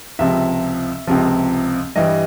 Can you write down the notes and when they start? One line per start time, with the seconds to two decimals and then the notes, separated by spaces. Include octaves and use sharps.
0.19 C#2 C3 F3 E5
1.07 C#2 C3 F3
1.96 G2 E3 G3 D#5